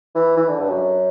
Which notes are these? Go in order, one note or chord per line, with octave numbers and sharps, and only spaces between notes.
E3
E3
D3
G2
F#2